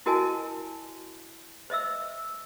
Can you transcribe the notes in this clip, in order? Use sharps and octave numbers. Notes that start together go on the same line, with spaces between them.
E4 F#4 A#4 D#5 G#5 A5
C5 D#5 E5 E6